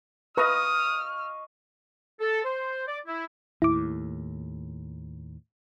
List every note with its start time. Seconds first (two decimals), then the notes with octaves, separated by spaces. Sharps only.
0.37 B4 D#5 F5 A#5 C#6 D#6 F6
2.20 A4
2.44 C5
2.87 D5
3.06 E4
3.62 D#2 A2 E4 D6